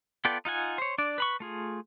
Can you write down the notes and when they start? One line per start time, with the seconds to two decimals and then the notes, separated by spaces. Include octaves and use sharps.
0.25 B3 F4 A4 D5 G5
0.45 D#4 F4 F#5 G#5
0.78 C5 C#5
0.98 D4 D5
1.18 B4 B5 C#6
1.40 A3 F4 G#4